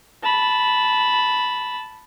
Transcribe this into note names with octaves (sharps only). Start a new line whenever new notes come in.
A5 B5